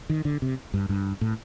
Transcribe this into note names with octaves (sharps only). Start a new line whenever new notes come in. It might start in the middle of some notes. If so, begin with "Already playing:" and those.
D#3
D3
C3
G2
G2
A2